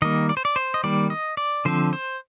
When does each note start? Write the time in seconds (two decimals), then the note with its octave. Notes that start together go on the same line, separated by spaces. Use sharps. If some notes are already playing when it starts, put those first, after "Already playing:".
0.02 D#3 G3 A#3 D#5
0.29 D5
0.37 C5
0.45 D5
0.56 C5
0.74 D#5
0.84 D#3 G3 A#3 D5
1.10 D#5
1.37 D5
1.65 D3 F3 C4 C5
1.93 C5